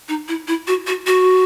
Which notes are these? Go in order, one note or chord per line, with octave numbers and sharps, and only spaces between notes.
D#4
E4
E4
F#4
F#4
F#4